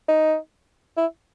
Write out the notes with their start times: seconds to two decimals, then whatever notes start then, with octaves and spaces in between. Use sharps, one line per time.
0.09 D#4
0.97 E4